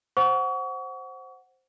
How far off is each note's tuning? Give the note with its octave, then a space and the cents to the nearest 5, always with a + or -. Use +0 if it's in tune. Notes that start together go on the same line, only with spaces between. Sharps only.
C5 +0 F#5 +0 C#6 +35